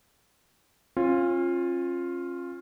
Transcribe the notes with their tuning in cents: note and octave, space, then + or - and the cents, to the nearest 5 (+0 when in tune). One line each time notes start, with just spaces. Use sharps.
C#4 -40 F4 +0